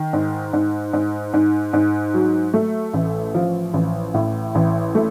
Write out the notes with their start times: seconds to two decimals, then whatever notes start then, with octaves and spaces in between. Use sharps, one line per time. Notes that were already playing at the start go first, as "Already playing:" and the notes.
Already playing: D#3
0.13 G#2
0.53 G#2
0.93 G#2
1.33 G#2
1.73 G#2
2.14 F#3
2.54 A3
2.94 A1
3.34 F3
3.74 A1
4.14 A2
4.55 A1
4.95 A3